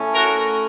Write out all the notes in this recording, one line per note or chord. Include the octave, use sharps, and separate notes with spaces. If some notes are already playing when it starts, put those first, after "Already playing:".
Already playing: A2 A3 C#4
F#4 A#4